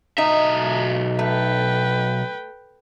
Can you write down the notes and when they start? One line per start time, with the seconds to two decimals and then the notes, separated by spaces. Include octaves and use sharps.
0.18 B1 D#4 E5
1.19 A3 B4 G5